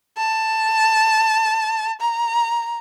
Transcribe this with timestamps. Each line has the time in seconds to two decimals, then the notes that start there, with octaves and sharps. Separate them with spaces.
0.17 A5
2.01 A#5